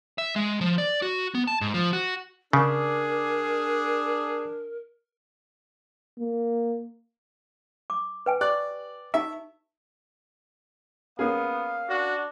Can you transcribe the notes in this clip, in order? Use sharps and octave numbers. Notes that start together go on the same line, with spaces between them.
E5
G#3
F3
D5
F#4
B3
A5
G#2
F3
F#4
C#3 D4 G#4 A#4
A#3
D6
B4 G5 G#5
G4 D5 F#6
D#4 G4 E5
A#3 B3 C#4 G#4 F5
D4 F#4